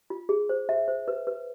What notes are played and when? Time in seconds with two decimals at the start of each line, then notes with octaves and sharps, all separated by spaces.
0.10 F4
0.29 G#4
0.49 C5
0.69 E5
0.88 C5
1.08 B4
1.27 B4